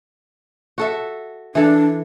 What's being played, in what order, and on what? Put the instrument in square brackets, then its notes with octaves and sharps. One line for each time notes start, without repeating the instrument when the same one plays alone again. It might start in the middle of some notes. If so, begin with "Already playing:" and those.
[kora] F#4 A4 E5
[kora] E3 A4 [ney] D4